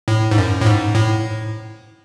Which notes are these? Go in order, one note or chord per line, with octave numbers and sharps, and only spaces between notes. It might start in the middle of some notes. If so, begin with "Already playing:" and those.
A2
G#2
F#2
A2
G#2
A2